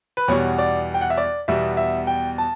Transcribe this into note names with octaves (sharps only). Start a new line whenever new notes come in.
B4
E2 B2 G3 C#5
D5
G5
F#5
E5
D5
E2 B2 G3 E5
E5
G5
A5